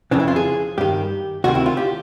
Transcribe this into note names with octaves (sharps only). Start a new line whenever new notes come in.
F2 C#3 E3 D4
E4
F4
G#4
G2 D#3 G4
D2 C3 D#3 F#4
E4
F4
G4